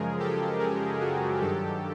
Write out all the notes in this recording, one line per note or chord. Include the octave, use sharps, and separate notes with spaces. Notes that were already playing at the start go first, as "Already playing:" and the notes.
Already playing: F#2 C#3 F3 G#3 G#4 A#4
G4 A4
G#4 A#4
F#4 G#4
G2 D#3 F#3 G4 A4